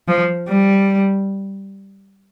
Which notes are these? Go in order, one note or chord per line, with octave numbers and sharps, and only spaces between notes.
F3
G3